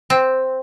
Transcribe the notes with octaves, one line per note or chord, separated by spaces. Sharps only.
C4